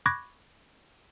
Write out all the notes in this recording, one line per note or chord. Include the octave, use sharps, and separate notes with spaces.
B5 C#6 D6 F#6 G#6 A#6